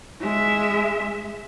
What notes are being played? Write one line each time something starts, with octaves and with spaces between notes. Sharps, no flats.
G#3 E5